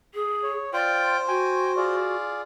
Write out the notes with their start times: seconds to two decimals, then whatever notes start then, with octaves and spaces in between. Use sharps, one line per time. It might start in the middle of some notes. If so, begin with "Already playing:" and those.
0.14 G#4
0.43 C#5
0.73 F4 C5 D5 G5
1.28 F#4 G5 G#5
1.76 F4 G#4 D5